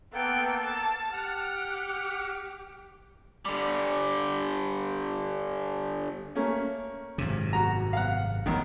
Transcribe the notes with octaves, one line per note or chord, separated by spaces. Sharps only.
A#3 B3 A4 G5
A5
G4 F#5 F6
D3 G3
A3 A#3 C#4
G#1 F#2 C3
F#4 A#5
F5 F#5
A1 E2 D#3